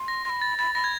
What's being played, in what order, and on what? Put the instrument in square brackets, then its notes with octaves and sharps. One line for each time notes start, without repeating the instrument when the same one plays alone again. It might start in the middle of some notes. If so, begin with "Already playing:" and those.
Already playing: [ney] C6
[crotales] A#6
[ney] B5 C6 [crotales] A#6
[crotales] A6
[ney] B5 [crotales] A6
[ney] B5 [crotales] A#6
[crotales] G#6